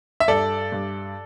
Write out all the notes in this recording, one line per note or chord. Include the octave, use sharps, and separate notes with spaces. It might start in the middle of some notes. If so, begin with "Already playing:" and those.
E5
G2 A4 D5
G2